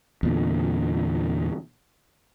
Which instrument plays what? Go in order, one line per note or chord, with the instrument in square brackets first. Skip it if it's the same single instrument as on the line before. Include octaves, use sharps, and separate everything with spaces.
[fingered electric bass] E2 A#2 D3